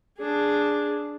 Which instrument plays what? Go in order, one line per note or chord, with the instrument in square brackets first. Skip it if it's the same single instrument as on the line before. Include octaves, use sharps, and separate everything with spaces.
[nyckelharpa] D4 G#4